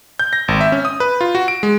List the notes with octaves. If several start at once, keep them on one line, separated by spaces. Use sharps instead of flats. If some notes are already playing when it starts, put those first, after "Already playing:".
G6
A#6
G#1
E5
C#4
D#6
B4
F4
F#4
D7
G#3